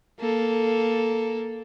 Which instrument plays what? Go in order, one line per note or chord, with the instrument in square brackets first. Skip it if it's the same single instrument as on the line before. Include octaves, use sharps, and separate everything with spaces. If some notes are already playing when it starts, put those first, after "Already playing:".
[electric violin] A#3 A4